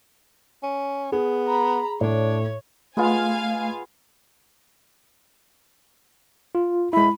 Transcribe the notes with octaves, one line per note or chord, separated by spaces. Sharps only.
C#4
B3 G#4
A#5 B5
A2 D4 C#5
G#3 A3 B3 F4 F5 G#5
F4
G#3 E4 B5